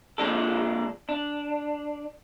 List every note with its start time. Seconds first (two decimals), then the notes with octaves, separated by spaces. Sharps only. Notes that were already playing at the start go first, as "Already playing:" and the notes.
0.18 A#2 F3 G#3 D4 A4
1.09 D4